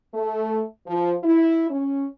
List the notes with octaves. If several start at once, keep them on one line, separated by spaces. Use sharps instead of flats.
A3
F3
E4
C#4